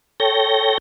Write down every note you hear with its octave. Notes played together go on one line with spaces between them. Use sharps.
A4 C#5 G5 A#6